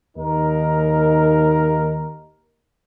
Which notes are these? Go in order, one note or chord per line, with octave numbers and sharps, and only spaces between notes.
D#2 D#4 A#4